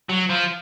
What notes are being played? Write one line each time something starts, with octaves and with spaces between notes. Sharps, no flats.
F#3
F3